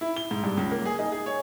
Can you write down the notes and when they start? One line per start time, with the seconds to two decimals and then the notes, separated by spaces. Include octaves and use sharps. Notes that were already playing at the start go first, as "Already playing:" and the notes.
0.01 E4
0.17 G7
0.31 G#2
0.44 G2
0.57 C#2
0.71 A#3
0.85 G#4
0.99 D#4
1.12 G#4
1.26 C#5